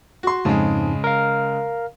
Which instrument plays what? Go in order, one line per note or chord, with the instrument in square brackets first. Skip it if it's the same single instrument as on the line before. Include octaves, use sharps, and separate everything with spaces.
[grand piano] F#4 C6
[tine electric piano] F2 G#2 A5 [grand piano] C#3 G#3
[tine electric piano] A#4 F5